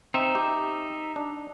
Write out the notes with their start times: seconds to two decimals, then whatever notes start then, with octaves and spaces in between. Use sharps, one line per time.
0.14 C4 D#4 E5
0.35 G4
1.16 D4